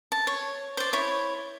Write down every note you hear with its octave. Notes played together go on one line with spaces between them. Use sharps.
A5
C#5
C5 D5
E4 C#5